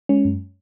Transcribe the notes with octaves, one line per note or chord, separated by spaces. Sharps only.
G#3 C#4
F#2